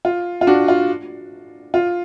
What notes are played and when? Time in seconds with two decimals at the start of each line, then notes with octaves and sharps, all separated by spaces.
0.05 F4
0.41 F4
0.47 D4 F#4
0.68 F4
1.74 F4